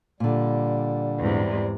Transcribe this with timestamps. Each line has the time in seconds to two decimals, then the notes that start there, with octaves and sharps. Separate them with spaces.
0.20 A#2 D3 G3
1.18 E2 G#2 C3